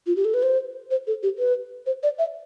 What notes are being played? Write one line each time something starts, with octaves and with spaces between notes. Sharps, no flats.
F4
G4
A4
B4
C5
C5
A4
G4
B4
C5
D5
E5